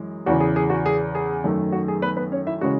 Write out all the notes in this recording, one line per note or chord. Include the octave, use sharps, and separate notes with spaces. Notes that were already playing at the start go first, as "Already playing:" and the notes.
Already playing: F#2 E3 G#3
E2 C#3 E3 F#4
G#4
G#4
F#4
G#4
G#4
F#2 D#3 A3
F#4
G#4
B3 B4
B3 B4
C#4 C#5
E4 E5
C#3 E3 G#3 C#4 F#4 F#5